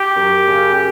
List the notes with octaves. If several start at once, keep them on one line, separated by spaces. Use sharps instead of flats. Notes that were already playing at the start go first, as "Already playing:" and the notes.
Already playing: G4
F#2
C#3